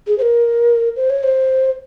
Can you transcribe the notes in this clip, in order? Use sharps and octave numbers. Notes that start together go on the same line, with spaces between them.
G#4
C5
A#4
C5
C#5
C5